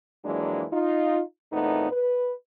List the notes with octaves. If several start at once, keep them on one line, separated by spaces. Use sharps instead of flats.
F2 E3 F#3 G#3 A#3 D4
D#4 F4
E2 A#2 A3 B3 C4 D#4
B4